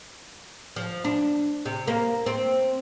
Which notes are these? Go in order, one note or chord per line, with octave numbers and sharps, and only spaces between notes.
F3
D4
C3
A#3
C4